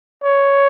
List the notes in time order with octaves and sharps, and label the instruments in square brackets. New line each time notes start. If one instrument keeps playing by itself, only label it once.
[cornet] C#5